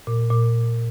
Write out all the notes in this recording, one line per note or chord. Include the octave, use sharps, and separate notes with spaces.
A#2
A#2